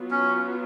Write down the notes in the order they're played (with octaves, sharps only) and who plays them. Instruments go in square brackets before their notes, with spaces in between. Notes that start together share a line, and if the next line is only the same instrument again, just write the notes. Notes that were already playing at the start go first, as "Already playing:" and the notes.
Already playing: [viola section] F#3 B3 F4
[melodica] C#4